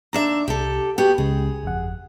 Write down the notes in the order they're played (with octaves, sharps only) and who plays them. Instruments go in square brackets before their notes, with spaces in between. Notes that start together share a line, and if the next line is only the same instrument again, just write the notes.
[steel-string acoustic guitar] D#2 D4 E5 [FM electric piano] A#5
[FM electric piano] C2 [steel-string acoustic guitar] G4 A4
[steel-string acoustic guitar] B3 F#4 G4 [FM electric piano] G5
[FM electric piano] C#2 C#3 G#3 [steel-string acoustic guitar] G#4
[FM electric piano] G1 F2 F#5